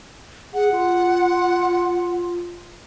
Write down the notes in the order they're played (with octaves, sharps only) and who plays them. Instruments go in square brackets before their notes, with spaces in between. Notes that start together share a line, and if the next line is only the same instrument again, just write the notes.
[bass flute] G#4 [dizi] F#5
[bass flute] F4